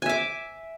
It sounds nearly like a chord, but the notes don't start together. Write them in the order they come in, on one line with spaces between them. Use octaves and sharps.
G#5 E5 D6